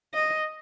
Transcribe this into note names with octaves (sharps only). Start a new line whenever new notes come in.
D#5